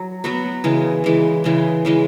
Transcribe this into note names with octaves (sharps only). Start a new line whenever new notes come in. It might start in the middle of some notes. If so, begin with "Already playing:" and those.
Already playing: F#3
F#3 B3 F#4 B4
C#3 E3 G#3
C#3 E3 G#3
C#3 E3 G#3
C#3 E3 G#3